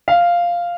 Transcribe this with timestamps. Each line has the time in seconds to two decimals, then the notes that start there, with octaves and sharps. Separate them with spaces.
0.08 F5